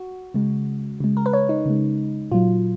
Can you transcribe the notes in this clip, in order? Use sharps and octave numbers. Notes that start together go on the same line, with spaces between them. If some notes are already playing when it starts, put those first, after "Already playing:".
Already playing: F#4
C#3 G#3
C#3 G#3
A#4
B4
C#5
D#4
C#3 G#3
A#2 F#3 F4